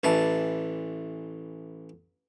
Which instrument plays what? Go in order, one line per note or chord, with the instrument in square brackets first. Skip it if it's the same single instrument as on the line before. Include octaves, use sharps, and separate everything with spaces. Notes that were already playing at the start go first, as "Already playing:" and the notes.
[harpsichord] A1 E3 A5